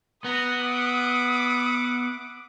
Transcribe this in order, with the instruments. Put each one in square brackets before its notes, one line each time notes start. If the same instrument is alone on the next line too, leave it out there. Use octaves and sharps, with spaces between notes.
[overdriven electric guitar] B3 [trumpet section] F#5 A#5 [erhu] D#6
[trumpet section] E5 F#5 D6